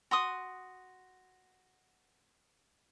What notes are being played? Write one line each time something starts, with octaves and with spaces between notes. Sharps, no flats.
F#4 C6 D#6